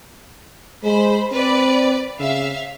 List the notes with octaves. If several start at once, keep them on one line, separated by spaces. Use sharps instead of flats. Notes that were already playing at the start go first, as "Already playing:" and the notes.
G#3 C5 B5
C4 B4 D5
C#3 E5 F5